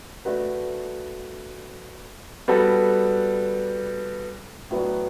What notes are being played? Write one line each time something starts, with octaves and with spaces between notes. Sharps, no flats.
A3 D4 F#4 B4
G3 B3 F#4 A4
A2 F#3 B3 D4